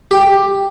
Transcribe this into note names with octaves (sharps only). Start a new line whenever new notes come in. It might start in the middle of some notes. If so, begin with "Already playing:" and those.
G4